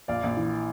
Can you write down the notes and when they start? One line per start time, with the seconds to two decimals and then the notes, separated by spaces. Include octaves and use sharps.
0.08 A#1 D5 F5
0.23 A#1
0.37 E3